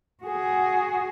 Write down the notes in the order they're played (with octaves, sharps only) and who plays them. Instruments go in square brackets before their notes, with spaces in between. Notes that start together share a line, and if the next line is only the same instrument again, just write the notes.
[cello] F#4 G#4